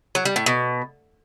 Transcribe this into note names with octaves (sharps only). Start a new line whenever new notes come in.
F#3
G3
A2
B2